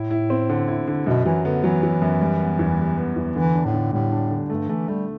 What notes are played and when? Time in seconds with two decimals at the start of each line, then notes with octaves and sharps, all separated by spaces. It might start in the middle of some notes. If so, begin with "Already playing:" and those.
Already playing: A2 E4
0.11 E4
0.30 C4
0.50 D3
0.68 E4
0.87 D3
1.07 F#2 B2
1.26 E3 F#3
1.45 D3 B3
1.64 E3 F#3
1.83 F#3
2.02 F#2
2.21 G3
2.40 B3
2.59 E2
2.78 G3
2.98 B3
3.16 E2
3.36 D3 E3
3.55 D4
3.65 A2
3.74 D3
3.92 A2 G3
4.12 D4
4.31 D3
4.50 G2 A3
4.69 E3 A3
4.88 G3 A3